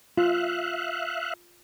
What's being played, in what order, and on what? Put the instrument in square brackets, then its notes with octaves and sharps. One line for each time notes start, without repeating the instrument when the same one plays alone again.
[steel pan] F4 [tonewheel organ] E5 F5 F#6